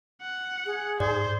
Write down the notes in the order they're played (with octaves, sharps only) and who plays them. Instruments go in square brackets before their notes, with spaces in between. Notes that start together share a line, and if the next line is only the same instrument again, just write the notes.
[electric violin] F#5
[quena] G#4
[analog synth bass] G#2 [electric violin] C5 [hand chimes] D5